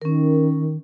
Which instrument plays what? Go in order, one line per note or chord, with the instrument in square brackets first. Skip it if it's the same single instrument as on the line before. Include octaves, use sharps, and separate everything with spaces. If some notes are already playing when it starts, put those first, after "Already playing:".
[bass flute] D#3 [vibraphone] C#4 A#4